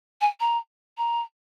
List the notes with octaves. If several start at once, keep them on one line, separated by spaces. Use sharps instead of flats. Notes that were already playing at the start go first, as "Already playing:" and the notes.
G#5
A#5
A#5